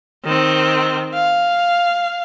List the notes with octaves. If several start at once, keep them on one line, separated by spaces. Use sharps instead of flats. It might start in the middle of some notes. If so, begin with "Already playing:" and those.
D#3 C4
F5